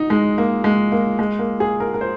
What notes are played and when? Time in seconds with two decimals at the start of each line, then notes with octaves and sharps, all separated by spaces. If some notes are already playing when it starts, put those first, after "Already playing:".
Already playing: D#4
0.10 G#3
0.38 A#3
0.64 G#3
0.92 A#3
1.19 G#3
1.39 A#3
1.60 G#4
1.80 A#4
1.94 A#4
2.01 C5